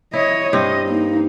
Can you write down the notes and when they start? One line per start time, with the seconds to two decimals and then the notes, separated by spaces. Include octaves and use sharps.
0.13 E4 C#5 D#5
0.53 G2 C4 D#5
0.87 A#3 D#4